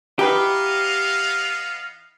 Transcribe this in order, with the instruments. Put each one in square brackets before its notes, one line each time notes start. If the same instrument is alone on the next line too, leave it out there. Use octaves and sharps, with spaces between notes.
[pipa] E3 D#4 B4 [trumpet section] B3 D#5 F5 [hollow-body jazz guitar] G4